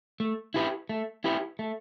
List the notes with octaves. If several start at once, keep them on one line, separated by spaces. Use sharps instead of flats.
A3
E4 G4 B4
A3
E4 G4 B4
A3